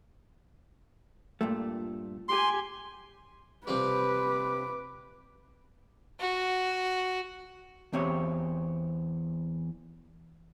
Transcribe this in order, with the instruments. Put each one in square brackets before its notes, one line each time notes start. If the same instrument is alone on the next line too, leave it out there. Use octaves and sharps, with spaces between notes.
[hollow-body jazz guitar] G2 A#2 A3
[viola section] G4 G#5 [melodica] C6
[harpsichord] C3 F3 G3 [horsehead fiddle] B4 [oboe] D6
[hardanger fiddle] F#4
[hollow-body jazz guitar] E2 C4 G4 C#5